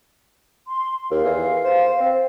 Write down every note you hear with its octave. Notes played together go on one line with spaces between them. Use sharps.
C6
D#2 F5
E2
C5
C4